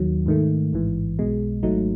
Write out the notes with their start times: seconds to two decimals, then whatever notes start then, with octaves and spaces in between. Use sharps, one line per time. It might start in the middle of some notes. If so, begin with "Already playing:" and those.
Already playing: D#2 D#3 F#3
0.26 G#2 D#3 A3
0.73 A1 G#2 E3
1.18 B1 B2 G#3
1.63 G#1 G#2 F#3 A3 D#4